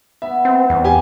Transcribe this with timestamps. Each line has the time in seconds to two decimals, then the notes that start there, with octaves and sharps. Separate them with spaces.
0.22 B3 E5 B5
0.45 C4
0.70 E2 G3 B4
0.85 G4 G#5